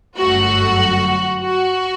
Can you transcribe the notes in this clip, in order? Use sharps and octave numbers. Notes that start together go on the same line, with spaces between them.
G1 F#2 F#3 A3 F#4
F#4